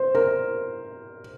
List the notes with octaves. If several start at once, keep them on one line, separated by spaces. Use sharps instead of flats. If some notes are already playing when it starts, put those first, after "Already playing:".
Already playing: C5
A#4